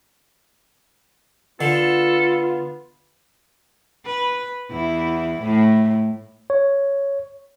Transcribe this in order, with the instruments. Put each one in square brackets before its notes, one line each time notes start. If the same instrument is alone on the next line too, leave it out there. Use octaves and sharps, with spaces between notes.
[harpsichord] D3 [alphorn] B3 [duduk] F4 [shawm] A4
[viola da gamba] B4
E2 E4
A2
[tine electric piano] C#5